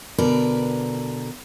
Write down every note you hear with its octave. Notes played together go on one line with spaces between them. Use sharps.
B2 D3 A#4 B4 D5